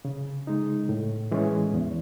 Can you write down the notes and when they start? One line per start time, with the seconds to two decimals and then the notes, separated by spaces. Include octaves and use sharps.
0.05 C#3
0.47 G#3 D#4
0.89 A2
1.31 E3 G#3 C#4
1.74 E2